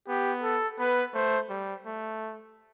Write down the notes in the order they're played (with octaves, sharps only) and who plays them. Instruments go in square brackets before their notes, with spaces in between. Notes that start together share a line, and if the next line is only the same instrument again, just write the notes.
[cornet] B3 [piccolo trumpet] G4
[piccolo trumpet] A4
[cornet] B3 [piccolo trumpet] B4
[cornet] A3 [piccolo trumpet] C5
[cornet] G3
A3